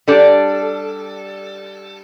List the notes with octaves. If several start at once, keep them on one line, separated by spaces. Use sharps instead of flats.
G3 D4 A4